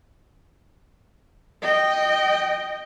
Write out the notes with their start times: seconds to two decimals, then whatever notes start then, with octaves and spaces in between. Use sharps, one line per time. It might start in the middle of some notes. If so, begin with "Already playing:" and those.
1.62 D#5 G5